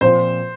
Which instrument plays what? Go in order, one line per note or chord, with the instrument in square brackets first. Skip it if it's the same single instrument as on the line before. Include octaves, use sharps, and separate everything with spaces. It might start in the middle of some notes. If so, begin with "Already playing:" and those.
[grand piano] A#2 F3 C4 F4 [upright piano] C5